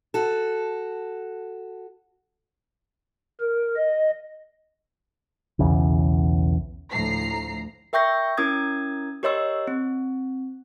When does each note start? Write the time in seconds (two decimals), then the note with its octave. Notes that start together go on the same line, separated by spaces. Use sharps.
0.14 F#4 A4
3.41 A#4
3.76 D#5
5.59 B1 E2 C#3
6.91 D2 A2 F3 A#5 C7
7.93 A#4 E5 G5 C#6 G6 A#6
8.37 C#4 E4 A#4 D#6 G#6
9.23 G4 A#4 C#5 D#5 C6 E6
9.67 C4